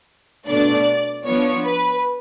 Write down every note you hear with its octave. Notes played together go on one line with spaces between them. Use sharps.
B2 A3 D4 D5
F3 B3 D4 C#5
B4